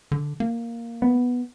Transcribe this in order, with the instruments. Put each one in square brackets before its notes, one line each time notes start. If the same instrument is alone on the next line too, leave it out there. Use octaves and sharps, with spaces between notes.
[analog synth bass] D3
A#3
[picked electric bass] B3